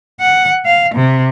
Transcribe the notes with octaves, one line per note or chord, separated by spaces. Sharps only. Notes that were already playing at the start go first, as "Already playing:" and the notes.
F#5
F5
C3